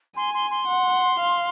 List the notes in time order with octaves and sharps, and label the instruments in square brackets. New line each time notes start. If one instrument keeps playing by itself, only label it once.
[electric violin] G#5 [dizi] C6
[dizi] C6
C6
[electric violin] F#5
F5